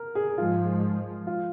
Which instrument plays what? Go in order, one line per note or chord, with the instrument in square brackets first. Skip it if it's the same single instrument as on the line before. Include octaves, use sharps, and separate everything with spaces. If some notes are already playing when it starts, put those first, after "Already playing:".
Already playing: [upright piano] A#4
G#4
[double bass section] G#2 F3 G#3 [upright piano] F4
[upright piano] F4